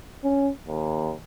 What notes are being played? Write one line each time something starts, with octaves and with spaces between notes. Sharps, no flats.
C#4
D#2